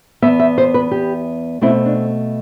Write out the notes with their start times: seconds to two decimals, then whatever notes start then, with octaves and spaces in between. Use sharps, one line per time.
0.22 E2 B2 B3 E5
0.40 E5
0.58 C5
0.74 B4
0.92 G4
1.61 B2 A3 C4 E4
1.86 D4